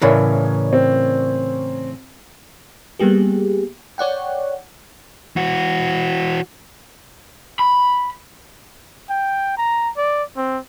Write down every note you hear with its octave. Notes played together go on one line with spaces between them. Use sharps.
A2 C#3 E3 A#4 C#5 D5
C4
G3 A#3 B3 G4 G#4
C#5 D5 F#5 G5
E3 F#4
B5
G5
A#5
D5
C4